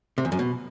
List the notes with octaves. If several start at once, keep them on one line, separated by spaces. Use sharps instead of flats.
C3
E2
F#2
B2